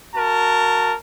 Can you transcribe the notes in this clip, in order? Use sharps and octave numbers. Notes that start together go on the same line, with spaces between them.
F#4 A#4 A5